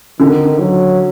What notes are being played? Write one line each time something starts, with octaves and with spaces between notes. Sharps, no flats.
D3 D#3
F#3